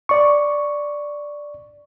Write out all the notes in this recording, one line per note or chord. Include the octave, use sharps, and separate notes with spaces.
D5 C#6